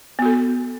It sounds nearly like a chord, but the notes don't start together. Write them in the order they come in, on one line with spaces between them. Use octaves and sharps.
B3 F#4 A4